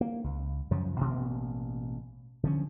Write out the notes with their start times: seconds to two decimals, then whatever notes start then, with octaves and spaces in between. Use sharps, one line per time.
0.01 A#3
0.24 C#2
0.70 F#2 C#3 F3 F#3
0.99 A1 B2 A#3
2.43 D3 F3 C#4